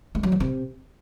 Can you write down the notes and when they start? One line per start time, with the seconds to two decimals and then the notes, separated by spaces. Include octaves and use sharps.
0.15 A3
0.23 F#3
0.32 D#3
0.40 C3